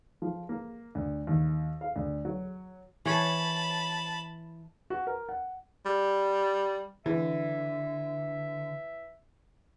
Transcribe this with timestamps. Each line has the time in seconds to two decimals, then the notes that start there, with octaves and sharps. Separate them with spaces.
0.22 F3
0.49 A#3
0.95 D2
1.27 D#2
1.81 F5
1.96 D2
2.25 F#3
3.06 E3 C#5 A5 B5
4.90 F#4
5.07 A#4
5.29 F#5
5.86 G3
7.06 D3 E3 E5